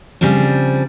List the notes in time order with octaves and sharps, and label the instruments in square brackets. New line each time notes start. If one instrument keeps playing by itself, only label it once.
[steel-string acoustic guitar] C#3 F3 G3 C4 D4